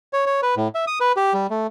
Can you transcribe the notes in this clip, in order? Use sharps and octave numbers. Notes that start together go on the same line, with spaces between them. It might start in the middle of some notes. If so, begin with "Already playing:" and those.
C#5
C#5
B4
A2
E5
D#6
B4
G4
G3
A3